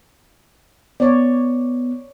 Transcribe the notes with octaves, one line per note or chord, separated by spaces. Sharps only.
B3 C#5 D5